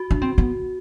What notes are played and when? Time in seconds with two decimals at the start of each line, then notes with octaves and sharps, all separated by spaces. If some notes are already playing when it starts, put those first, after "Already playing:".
Already playing: F#4
0.11 D4
0.22 C4
0.38 B3